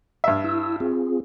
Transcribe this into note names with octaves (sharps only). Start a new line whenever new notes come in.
G2 E5
E4 E6
C4 F4 G#4